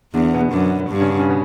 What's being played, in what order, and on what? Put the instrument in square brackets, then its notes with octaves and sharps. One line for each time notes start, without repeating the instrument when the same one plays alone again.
[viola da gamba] E2 [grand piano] D3 D4
[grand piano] B2 B3
[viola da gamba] F#2 [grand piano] D3 D4
[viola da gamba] G2 [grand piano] D3 D4
[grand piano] C#3 C#4
D3 D4
C#3 C#4
B2 B3